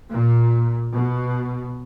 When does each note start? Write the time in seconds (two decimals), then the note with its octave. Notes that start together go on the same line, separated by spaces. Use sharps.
0.11 A#2
0.94 B2